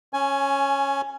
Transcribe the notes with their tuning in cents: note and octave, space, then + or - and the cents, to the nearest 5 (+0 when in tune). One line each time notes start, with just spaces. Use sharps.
C#4 -10 G#5 +15